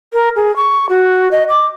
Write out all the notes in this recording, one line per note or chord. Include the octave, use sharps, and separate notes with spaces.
A#4
G#4
C#6
F#4
D#5
D6